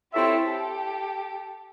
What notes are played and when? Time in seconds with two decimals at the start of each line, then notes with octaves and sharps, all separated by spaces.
0.13 C4 E4 F4 G4 A4 C#5 E5
0.46 G4 A4